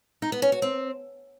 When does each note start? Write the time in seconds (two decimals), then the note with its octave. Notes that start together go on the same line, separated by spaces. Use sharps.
0.22 D#4
0.32 B3
0.42 C#4
0.52 F#4
0.62 C4